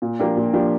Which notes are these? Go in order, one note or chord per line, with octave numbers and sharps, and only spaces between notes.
A#2
F3 A#3 D4 G4
A#2
F3 A#3 D4 G4